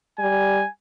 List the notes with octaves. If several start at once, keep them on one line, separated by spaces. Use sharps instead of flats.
G3 G#5